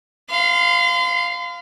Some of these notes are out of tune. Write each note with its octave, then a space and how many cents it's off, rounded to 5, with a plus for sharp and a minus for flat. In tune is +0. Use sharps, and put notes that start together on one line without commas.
F5 +0 C6 -40